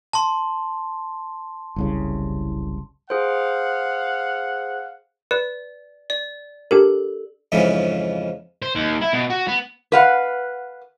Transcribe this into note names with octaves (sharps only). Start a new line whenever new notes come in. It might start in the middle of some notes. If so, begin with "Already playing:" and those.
A5 C6
F#1 C2 C#3
G#4 C5 F5 F#5
B4 D5
D5
D4 G4 A4 A#4
F2 G#2 C#3 E3 F3
C5
D#2
E4
B2
F#4
B3
B4 F5 F#5